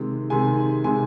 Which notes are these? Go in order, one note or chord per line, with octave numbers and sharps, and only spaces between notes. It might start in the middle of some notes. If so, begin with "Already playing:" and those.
Already playing: C3 D#3 G#3
C3 D#3 G#3 G#5
C3 D#3 G#3 G#5